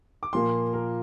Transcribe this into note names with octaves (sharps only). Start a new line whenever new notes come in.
D6
A#2 F3 A#3 C6
A#4